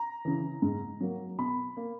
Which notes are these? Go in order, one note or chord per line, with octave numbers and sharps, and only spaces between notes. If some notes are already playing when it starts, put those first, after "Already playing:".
Already playing: A#5
C#3 E3
G#2
F#3 A#3
B2 B5
A#3